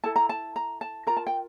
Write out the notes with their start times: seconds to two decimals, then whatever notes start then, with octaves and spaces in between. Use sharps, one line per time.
0.04 E4 A4 A5
0.16 A#5
0.29 A5
0.56 A#5
0.81 A5
1.07 F4 A#4 A#5
1.17 A5
1.27 G5